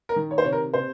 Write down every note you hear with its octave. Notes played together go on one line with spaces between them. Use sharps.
A#4
D#3
C#5
C5
C3 C#5
A#4
C3 C5